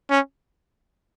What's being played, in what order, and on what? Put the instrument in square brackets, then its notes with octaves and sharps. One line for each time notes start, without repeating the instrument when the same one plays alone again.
[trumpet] C#4